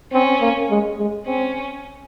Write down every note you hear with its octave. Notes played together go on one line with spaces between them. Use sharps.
C4 C#4
A#3
G#3
G#3
C4 C#4